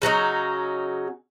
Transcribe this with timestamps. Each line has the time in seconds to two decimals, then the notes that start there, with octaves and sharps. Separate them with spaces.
0.02 C#3 F#3 C#4 D#4